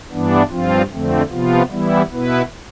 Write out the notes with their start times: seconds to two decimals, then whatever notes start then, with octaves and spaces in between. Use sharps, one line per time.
0.11 G2 E3 B3 D4
0.50 G2 F3 C4 F4
0.90 F2 D3 A3 C4
1.30 C3 F3 B3 F4
1.70 E3 G3 B3 E4
2.10 B2 B3 E4 B4